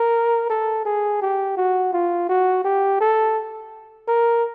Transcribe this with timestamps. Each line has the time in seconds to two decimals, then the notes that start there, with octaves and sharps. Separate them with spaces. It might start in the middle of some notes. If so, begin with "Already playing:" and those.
Already playing: A#4
0.50 A4
0.85 G#4
1.22 G4
1.57 F#4
1.93 F4
2.29 F#4
2.65 G4
3.01 A4
4.08 A#4